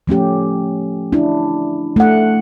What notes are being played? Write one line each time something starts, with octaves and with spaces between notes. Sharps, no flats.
F3 A3 C#4 G4
D4 E4
A3 F#5